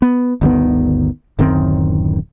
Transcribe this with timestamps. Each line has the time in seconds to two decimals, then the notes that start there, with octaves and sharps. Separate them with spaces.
0.02 B3
0.41 G1 D2 D#3 B3
1.39 D1 F#2 D#3 C4